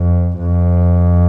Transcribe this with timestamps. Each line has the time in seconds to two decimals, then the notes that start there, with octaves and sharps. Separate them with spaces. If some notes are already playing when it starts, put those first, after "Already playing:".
Already playing: F2
0.39 F2